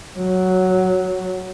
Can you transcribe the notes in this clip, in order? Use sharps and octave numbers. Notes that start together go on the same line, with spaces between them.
F#3